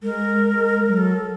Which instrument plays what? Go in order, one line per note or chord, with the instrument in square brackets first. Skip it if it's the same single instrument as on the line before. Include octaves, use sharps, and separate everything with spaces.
[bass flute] G#3 [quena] A#4
[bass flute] G#3
G3
[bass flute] F#3 [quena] A#4
[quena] A4